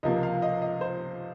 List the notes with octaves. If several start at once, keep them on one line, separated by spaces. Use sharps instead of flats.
C#2 C3 F3 A#3 D#5
F5
D#5
D#5
C5